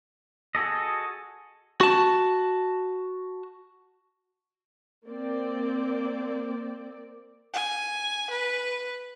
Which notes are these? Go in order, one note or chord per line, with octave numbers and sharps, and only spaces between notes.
F#4 G#4 A4 D#5
F#4 A5
A#3 C4 D5
G#5
B4